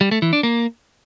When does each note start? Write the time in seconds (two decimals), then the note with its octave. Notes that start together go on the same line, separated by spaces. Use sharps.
0.01 G3
0.11 A3
0.22 E3
0.33 D4
0.43 A#3